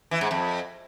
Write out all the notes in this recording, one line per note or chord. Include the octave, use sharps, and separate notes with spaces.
E3
G#2
F2